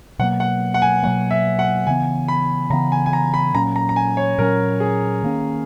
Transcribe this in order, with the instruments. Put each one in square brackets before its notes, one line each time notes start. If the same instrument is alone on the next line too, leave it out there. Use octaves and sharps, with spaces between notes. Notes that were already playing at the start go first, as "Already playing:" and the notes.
[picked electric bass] B2 F#3 A#3 [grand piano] F#5
[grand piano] F#5
F#5
G#5
[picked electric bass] B2 F#3 A#3 [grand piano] F#5
[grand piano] E5
F#5
[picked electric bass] C#3 E3 B3 [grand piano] G#5
[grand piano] B5
[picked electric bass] C#3 E3 B3 [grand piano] A#5
[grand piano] G#5
G#5
A#5
B5
[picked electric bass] A#2 F#3 C#4 [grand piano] A#5
[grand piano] A#5
A#5
G#5
C#5
[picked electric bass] A#2 F#3 C#4 [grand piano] A#4
[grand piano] G#4
[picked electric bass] D#3 A#3 C#4